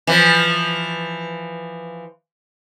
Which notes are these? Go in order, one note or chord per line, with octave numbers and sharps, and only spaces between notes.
E3 F3